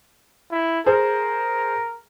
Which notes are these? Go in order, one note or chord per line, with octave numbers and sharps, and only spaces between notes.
E4
G#4 A#4 C5